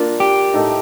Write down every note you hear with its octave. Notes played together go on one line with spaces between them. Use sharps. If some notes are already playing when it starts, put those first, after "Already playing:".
Already playing: A#3 D4 F4 A#4
G4
A2 A3 D#4